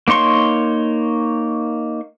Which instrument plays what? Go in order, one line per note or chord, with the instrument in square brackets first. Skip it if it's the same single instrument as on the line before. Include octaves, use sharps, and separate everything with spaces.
[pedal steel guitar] A#3 D#4 C#5 C6 C#6